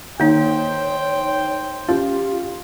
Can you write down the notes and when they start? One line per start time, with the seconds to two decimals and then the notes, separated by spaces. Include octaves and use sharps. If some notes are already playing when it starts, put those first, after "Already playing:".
0.20 D#3 A#3 D#4 C5 C#5 G5
1.89 C#4 F4 G4